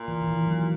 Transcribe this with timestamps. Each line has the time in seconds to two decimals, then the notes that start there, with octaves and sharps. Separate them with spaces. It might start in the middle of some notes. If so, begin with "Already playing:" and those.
Already playing: A#2
0.08 E3
0.22 D#3
0.28 E3
0.47 F#3